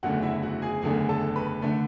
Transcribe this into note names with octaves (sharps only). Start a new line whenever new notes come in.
F#1 E2 D3 A3 F#4 F#5
E4 E5
F#4 F#5
G#4 G#5
F#1 E2 D3 A3 G#4 G#5
A4 A5
B4 B5
D3 A3